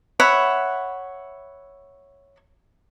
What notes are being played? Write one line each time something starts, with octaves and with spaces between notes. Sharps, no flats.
C#5 E5 F#5 B5